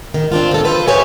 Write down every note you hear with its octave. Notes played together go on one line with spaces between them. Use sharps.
D#3
C4 D4 F4
D#3 A4
F4 B4 C5
G4 B4 C#5 D#5 E5 G#5